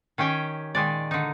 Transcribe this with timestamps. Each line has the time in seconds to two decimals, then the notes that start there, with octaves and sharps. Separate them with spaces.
0.18 D#3 C#4 G4 G5 G#5
0.75 A#2 D#3 G#3 D5
1.11 D3 D#4